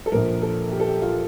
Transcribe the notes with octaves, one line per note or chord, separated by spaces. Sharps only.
A4
A#1 A#2 F3 A#4
A4
G4
A4
G4
F4